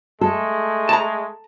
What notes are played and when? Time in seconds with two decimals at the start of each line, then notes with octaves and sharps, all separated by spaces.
0.21 G#3 A3 A4
0.89 A5 A#5